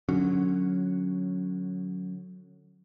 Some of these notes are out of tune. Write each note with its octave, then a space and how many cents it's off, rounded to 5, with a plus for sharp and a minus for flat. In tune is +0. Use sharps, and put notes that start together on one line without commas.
D3 +20 F#3 -10 C#4 +0